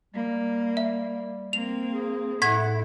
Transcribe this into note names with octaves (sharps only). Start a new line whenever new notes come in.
G3 A#3
E5
A#3 C4 F7
G#4
A2 E4 F#5 G#6 B6